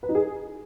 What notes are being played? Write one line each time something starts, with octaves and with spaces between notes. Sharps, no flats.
B4
D#4
G#4